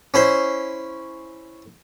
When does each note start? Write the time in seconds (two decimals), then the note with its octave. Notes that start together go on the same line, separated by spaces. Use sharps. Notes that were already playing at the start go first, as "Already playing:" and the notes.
0.14 C#4 E4 C5